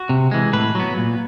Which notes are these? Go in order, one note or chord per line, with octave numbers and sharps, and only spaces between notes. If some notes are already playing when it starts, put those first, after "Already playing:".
Already playing: F#4
C3
E3 G#3
A2 B4
F#3 B3
A#2